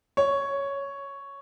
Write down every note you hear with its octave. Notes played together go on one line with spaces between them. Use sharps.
C#5